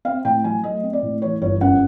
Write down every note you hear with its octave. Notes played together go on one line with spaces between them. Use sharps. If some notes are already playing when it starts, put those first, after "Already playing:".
C4 F5
A2 G5
F#3 G#5
A3 D#5
C4
D5
A2
E3 C#5
G1 C#5
F#2 F#5